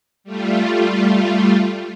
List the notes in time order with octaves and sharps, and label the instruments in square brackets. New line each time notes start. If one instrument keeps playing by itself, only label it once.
[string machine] G3 A3 F4